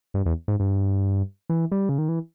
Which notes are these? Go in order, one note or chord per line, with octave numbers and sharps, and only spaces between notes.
G2
E2
G#2
G2
E3
G3
C#3
D#3
E3